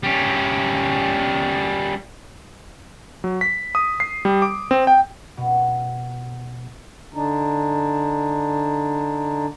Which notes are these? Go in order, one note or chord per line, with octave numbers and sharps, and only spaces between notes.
G3 C#4
F#3
B6
D#6
C7
G3
D6
C4
G5
B2
D3 D4 D#4